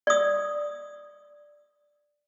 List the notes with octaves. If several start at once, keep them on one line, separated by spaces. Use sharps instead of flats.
D5 D#6